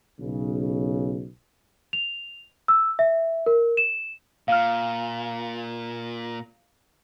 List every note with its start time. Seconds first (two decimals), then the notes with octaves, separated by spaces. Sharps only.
0.20 B1 C#3
1.93 F7
2.68 E6
2.99 E5
3.46 A#4
3.77 E7
4.48 A#2 F5 F6